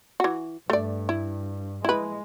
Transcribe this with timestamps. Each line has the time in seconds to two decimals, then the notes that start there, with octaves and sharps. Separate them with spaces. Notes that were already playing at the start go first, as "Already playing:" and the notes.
0.20 E3 F#4
0.70 G2 A3 D5
1.09 E4
1.85 G#3 E4 B4